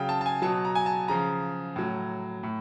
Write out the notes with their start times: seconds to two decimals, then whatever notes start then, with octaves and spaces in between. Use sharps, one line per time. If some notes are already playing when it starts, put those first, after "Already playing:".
Already playing: C#3 F#3 F5 G5
0.09 A5
0.21 A5
0.26 G#5
0.42 B2 F#3 A5
0.65 A#5
0.75 G#5
0.86 A5
1.08 C#3 F3 A#5
1.76 A2 F#3
2.43 A2